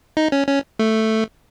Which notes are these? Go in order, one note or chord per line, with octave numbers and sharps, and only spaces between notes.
D#4
C#4
C#4
A3